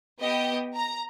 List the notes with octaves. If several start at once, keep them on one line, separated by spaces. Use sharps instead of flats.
B3 G4 D#5 G5 G6
A#5